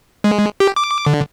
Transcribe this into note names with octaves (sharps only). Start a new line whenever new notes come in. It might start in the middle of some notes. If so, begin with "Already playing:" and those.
G#3
G4
D6
D3